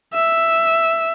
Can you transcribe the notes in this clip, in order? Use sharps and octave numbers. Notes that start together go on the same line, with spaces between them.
E5